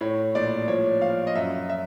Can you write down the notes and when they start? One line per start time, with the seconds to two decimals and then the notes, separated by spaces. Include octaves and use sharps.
0.01 A2 C#5
0.35 A#1 D5
0.68 F3 C#5
1.02 F3 F5
1.27 D#5
1.35 F#2 E5
1.70 E5